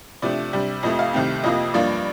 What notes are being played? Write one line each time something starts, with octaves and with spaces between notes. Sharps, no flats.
C3 F3 A3 D4 D5
C3 G3 D4
F2 C3 F3 A3 D#5
F5
C2 C3 D#3 A3 C4
F2 C3 F3 A#3 D#5
G2 F3 A#3 D4 D5